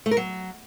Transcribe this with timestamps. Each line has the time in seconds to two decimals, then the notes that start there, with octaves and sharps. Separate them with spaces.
0.06 A3
0.11 A#4
0.17 F#3